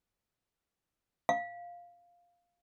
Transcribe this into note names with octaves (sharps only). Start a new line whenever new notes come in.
F5